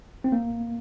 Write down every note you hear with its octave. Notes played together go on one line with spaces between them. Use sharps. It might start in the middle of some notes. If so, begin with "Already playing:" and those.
C4
A#3